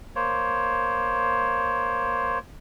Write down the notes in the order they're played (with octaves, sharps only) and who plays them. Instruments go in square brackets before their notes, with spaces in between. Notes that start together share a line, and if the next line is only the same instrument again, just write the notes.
[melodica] A#3 C5 C#5